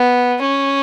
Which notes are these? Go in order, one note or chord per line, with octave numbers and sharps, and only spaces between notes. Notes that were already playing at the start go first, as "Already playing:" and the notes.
Already playing: B3
C#4